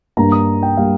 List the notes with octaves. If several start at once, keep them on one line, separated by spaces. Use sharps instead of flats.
G2 G3 A#3 A#5
D#6
G5
G3 A#3 F5